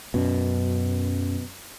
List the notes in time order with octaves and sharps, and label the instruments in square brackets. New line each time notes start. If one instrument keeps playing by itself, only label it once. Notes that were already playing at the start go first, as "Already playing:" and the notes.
[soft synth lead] F#2 [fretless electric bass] B2